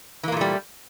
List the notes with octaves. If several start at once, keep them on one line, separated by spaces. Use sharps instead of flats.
A#2 E3 G3 A3 A#3